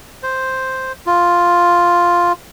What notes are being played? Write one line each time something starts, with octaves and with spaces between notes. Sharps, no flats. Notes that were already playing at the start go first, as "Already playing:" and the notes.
C5
F4